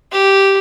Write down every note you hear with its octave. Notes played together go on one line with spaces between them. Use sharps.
G4